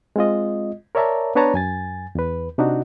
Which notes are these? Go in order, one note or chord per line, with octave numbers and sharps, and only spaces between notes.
G#3 C4 F4 D#5
A#4 C#5 D5 E5 A5 A#5
B3 D4 B4 C#5 A5 A#5
F#2 G#5 A6
E2 B4
C3 D4 D#4 F#4